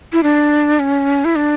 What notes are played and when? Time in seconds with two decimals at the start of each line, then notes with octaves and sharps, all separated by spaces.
0.13 E4
0.23 D4
0.80 C#4
1.25 E4
1.36 D4